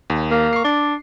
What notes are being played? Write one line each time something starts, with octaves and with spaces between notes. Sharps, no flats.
D#2
A#3
C#6 C7
D4 D5